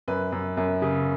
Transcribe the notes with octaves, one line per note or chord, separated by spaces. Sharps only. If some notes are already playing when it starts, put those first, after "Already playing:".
F#2 B4
F#2
F#2
C#3